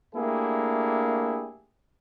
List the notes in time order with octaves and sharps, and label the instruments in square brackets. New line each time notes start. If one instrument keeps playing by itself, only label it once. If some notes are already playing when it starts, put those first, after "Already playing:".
[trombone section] A3 A#3 D4 E4 G4 G#4